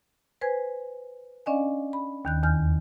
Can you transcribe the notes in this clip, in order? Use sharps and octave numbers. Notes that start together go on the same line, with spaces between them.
B4 C5 G#5 G#6
C#4 D4 D5 D#5 F5 G#5
B5
D#2 D#3 F#6
E2 D#3 F6 G6